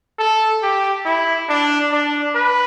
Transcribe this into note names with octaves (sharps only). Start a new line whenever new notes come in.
A4
G4
E4
D4
D4
B4